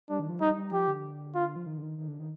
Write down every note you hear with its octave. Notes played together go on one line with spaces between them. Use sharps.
G3 D4
D#3
F3
G3 D#4
G3
F3 G4
D3
F4
F3
D#3
D3
D#3
D#3
D3
D#3